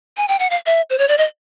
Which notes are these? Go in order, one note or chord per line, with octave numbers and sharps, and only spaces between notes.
G#5
G5
F#5
F5
E5
C5
C#5
D5
D#5